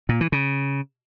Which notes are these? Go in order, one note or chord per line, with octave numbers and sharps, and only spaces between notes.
A#2
E3
C#3